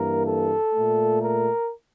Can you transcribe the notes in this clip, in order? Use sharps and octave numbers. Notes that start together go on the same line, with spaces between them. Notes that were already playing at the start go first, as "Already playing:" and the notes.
Already playing: G2 E3 A#3 A#4
A4
A#2 A3
A#4